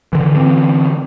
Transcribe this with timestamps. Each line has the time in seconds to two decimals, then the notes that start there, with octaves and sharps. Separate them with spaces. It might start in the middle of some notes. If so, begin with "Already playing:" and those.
0.13 D3 E3
0.35 D3 E3 C4